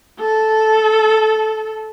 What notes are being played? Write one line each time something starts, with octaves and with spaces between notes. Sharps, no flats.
A4